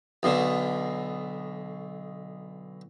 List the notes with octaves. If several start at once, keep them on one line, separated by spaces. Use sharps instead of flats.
B1 B2 D3